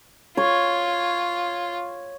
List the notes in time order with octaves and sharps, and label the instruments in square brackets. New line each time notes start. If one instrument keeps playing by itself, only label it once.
[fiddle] F4 [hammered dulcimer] C#5